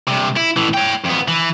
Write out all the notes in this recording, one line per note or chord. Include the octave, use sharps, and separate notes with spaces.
G2 C3
E4
A2 E3
C#5 G5
F2 B3
E3